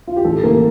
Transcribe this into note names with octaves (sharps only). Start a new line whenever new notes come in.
F4
G4
A1 A4
A1 A#3